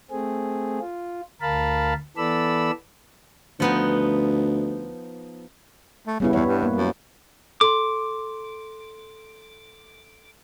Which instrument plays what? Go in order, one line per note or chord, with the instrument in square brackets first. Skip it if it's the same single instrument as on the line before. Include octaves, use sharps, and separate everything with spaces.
[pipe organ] A3 C4 G#4
F4
D2 A#4 F5 A5 B5
E3 B3 A4 D5 B5 E6
[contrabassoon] D2 [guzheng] F3 B3 D#4
[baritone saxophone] A3
[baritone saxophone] C#3 [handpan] G3 B3 E4
[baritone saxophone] E2 [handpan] B3 C#5
[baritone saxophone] G2
[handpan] A#3
[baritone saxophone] F#2
[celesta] A4 C6 [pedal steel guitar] D6